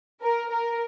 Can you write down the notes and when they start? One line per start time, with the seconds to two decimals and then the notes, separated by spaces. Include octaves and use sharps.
0.22 A#4
0.51 A#4